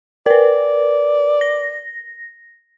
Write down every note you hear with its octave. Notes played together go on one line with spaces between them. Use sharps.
A#4 B4 D5
A#6